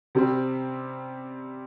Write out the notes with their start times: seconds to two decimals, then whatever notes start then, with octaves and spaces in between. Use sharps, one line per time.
0.15 C3 G3 C4